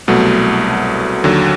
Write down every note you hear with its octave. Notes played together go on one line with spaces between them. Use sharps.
C2 B2 F#3 A3
D#2 D3 F#3